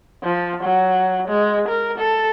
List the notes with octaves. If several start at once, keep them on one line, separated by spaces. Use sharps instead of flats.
F3
F#3
G#3
A#4
A4